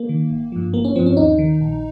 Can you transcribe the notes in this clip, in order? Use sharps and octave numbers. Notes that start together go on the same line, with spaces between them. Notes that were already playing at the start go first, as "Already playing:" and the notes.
Already playing: A#3
D#3
G#1
G2 F3
G#1 A#3
C#4
G2 F3 C4
C#4
D#2 D#4
D#3
A#1